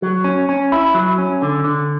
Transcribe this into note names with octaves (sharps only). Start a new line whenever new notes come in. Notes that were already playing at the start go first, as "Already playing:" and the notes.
F#3
C#4
C#4
E4
F#3
C#4
D3
D3